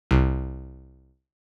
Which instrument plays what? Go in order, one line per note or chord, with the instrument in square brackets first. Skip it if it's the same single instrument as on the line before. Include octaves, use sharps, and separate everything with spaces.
[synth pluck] C2